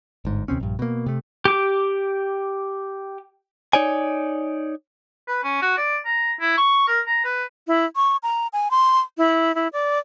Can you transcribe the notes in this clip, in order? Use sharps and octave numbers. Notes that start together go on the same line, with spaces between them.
G1 G#2
D#2 C3 C4 C#4
A#1 G2
B2 A#3
C3 A3
G4 D6
D#4 C#5 D5 G#5
B4
C#4
F#4
D5
A#5
E4
C#6
A#4
A#5
B4
E4
C#6
A#5
G#5
C6
E4
E4
D5